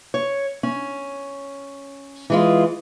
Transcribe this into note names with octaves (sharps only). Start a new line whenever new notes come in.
C#5
C#4
E3 G#3 F4